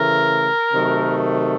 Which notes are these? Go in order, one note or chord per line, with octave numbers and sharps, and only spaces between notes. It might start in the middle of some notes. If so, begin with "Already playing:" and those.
Already playing: C#3 E3 A3 A#4
C3 D#3 F#3 A3